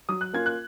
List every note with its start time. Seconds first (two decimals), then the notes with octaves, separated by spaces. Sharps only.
0.09 F#3 D#6
0.21 F#6
0.33 A#3 C#4 F4 G#6
0.46 F#6